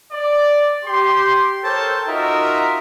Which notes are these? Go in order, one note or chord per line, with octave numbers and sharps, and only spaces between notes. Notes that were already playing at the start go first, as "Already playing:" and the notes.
D5
G4 C6
A4 A#4 C5 C#5 G5 A5
D#4 F4 F#4 A#4 D#5 E5